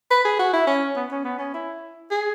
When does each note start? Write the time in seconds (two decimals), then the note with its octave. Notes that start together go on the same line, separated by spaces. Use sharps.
0.11 B4
0.25 G#4
0.39 F#4
0.53 E4
0.67 C#4
0.96 B3
1.11 C#4
1.24 B3
1.39 C#4
1.54 E4
2.11 G#4